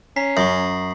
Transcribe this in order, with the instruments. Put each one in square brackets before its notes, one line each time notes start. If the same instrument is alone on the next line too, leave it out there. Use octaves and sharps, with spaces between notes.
[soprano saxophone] C#4 [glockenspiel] A#5 B6 C7
[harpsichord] F#2 [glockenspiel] C#6 D#6 F#7